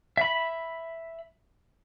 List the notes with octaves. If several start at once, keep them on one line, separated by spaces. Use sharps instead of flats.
E5 B5